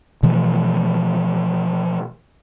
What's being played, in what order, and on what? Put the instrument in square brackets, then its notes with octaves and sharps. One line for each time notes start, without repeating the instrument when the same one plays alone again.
[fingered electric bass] B2 E3 F3 A3